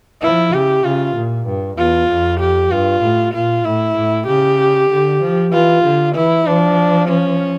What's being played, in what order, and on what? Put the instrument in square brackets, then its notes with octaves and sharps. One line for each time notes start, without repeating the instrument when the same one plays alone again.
[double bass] F3 [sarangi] E4
[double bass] C#3 [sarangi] G4
[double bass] C#3 [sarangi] F4
[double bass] A#2
G2
[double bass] E2 [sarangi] F4
[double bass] F2
[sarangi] G4
[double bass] G2 [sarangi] F4
[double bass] A2
[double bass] A#2 [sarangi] F4
[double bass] A2 [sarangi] E4
[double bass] A2
[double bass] C#3 [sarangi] G4
[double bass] D3
F3
[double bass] E3 [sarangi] F4
[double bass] D3
[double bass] E3 [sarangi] E4
[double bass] F3 [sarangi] D4
[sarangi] C#4